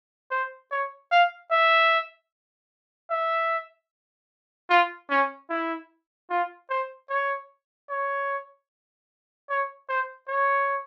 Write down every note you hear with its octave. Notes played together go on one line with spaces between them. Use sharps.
C5
C#5
F5
E5
E5
F4
C#4
E4
F4
C5
C#5
C#5
C#5
C5
C#5